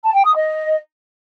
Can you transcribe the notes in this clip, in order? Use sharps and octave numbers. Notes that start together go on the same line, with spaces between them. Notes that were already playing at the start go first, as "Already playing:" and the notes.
A5
G5
D#6
D#5